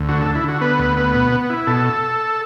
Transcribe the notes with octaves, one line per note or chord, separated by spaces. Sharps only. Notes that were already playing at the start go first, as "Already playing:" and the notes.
Already playing: D2
D3 F#4
D3 A4
E4
D3 F#4
B3 B4
D2
B3
B2
B3
E4
B2 A4